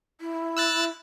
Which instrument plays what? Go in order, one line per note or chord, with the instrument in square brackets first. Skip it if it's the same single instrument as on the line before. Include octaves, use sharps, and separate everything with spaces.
[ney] E4
[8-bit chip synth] E6 F#6 A6